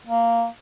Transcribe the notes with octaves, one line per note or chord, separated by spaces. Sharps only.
A#3